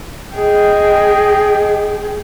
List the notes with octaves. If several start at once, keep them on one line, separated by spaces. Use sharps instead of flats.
G#4 D#5 G5